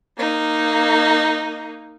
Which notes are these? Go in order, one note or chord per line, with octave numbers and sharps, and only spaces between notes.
A#3 D#4